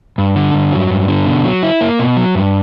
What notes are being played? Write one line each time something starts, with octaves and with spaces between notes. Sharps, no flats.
G2
D3
G2
F#3
G2
D3
B2
F#3
E4
A#3
B2
F#3
G2